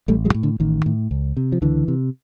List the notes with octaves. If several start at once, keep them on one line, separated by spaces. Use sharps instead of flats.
A1 G3 A3
F#3 G#3
A2
D3
A1 D#3
A2
C#2
C3
F3
C#2 D3 E3
C3